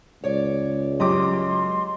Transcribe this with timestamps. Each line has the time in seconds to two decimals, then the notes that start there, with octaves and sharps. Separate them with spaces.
0.24 C#2 C#5 D5
1.00 F#2 G4 D#5 C6 D6